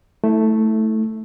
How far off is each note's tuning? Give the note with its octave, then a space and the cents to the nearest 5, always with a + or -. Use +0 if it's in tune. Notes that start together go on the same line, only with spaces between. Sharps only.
A3 +0 E4 -30